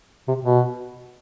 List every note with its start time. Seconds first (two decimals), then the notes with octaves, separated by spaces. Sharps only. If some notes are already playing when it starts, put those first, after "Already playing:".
0.28 C3
0.45 B2